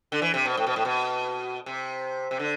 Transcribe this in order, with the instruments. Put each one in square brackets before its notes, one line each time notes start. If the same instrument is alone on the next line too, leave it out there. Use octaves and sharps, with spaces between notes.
[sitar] D3
E3
C3
B2
A2
B2
A2
B2
C3
C3
D3